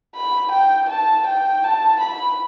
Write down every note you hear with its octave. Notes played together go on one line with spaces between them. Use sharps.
B5
G5
A5
G5
A5
B5